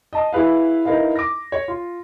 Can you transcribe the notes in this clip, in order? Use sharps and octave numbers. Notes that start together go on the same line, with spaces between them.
D#5 A5 D#6
E4 G#4 B4 F5
D#4 E4 A#4 B4 D#5 F5
D6 A#6
C#5
F4